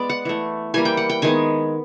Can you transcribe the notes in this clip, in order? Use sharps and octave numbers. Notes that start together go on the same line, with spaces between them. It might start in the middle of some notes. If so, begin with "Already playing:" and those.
Already playing: G#3 B3 D5
F#5
E3 A3
E3 G3 A#3 G#5
G5
F#5
G5
D#3 G#3 B3 G#5